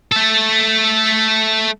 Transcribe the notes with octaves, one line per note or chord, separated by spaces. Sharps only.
A3 A4